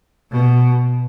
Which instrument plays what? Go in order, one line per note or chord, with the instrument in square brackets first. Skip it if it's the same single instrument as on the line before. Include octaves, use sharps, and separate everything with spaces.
[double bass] B2